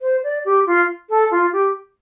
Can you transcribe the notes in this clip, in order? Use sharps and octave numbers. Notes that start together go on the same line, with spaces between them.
C5
D5
G4
F4
A4
F4
G4